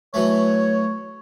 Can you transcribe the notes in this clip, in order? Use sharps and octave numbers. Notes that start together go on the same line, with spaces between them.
E3 F#3 A3 C#5